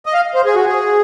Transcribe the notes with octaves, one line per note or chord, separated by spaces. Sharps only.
D#5
F5
C5
G#4
F#4
G#4